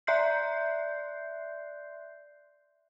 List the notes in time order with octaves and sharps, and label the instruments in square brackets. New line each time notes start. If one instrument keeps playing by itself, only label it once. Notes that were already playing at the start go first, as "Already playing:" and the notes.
[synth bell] D5 E5 C6 F#6 G6 C7